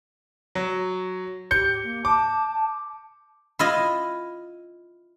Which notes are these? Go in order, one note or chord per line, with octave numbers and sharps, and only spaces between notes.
F#3
G4 G6 C#7
A#3
A5 D6
E4 F4 D#5